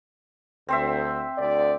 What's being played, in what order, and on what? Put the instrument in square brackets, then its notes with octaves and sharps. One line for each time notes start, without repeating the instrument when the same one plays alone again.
[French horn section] D2 [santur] C4 C5 E5
[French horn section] D2 D5